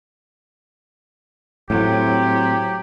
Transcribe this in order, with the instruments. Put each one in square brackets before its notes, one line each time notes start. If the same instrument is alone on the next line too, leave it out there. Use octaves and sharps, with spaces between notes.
[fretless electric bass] A2 [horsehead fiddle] F#3 [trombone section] C4 [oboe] G4